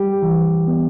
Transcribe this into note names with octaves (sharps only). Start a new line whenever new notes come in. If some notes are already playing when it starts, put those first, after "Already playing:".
Already playing: G3 G4
E3
B3